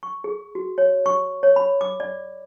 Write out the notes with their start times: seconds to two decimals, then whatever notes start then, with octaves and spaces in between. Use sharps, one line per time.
0.03 C#6
0.24 G#4
0.55 F#4
0.78 C#5
1.06 C#6
1.43 C#5
1.56 B5
1.81 D6
2.00 D5